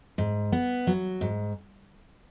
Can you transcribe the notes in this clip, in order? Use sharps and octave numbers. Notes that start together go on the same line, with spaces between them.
G#2
B3
F#3
G#2